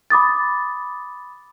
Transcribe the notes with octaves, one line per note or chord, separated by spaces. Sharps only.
B5 D6 D#6 A6